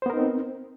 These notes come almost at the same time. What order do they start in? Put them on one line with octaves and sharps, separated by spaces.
C5 B3 A#4 D#4 C4